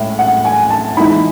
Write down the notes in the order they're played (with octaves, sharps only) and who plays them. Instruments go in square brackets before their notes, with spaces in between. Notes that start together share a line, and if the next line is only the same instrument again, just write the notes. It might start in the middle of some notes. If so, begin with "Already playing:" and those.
Already playing: [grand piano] A2 G#3 E5
F#5
G#5
A5
E3 G#3 D#4 B5